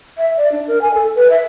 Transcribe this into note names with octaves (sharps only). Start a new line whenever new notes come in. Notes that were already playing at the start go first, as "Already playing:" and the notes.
E5
D5
D4
A#4
G#5
A4
B4
E5